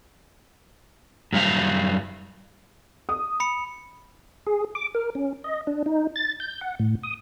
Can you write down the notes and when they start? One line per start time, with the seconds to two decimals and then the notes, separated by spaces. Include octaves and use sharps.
1.33 F#2 G3 E5 F5
3.09 D#6
3.40 B5 C#7
4.47 G#4
4.75 D6
4.95 A#4
5.15 C#4
5.44 D#5
5.67 D4
5.86 D#4
6.16 A6
6.40 G6
6.61 F#5
6.79 A2
7.03 D#6